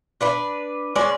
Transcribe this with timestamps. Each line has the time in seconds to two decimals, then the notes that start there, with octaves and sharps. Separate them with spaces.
0.21 D4 B4 D5
0.96 G#3 C#4 D5